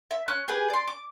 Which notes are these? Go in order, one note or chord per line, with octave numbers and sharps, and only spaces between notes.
E5
C#4 F#6
G4 G#4 B4 G#5
D5 C6
D6